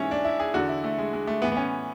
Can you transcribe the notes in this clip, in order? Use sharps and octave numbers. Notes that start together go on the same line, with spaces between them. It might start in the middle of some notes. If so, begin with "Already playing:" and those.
Already playing: G#2 E3 C#4 E4
D4
E4
G#4
E2 D3 F#4
E4
A3
G#3
G#3
A3
A2 E3 B3
B3
C#4